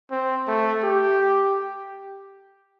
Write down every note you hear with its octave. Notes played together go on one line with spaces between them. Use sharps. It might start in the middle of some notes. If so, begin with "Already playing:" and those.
C4
A3
G4